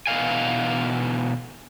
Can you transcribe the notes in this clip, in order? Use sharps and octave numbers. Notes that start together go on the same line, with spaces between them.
B2 D3 E3 D#4 F5 G#5